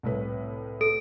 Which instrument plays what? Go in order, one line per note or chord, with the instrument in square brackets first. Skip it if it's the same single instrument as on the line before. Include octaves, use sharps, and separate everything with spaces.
[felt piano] C2 A2 B4
[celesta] A4 [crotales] D7